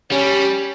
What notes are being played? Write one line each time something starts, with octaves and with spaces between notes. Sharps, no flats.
G3 C#4